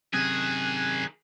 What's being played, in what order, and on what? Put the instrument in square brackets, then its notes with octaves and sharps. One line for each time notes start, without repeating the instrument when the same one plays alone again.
[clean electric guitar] F#2 C3 [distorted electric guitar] D#3 G#4 [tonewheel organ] F#6 G#6